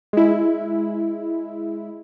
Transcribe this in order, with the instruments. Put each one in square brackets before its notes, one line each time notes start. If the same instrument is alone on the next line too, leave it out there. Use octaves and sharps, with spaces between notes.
[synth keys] G#3 E4